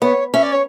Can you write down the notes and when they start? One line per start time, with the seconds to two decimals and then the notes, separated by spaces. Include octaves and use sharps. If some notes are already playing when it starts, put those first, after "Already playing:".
0.02 B3 C#5
0.33 C#4 E5
0.43 D5
0.52 C#5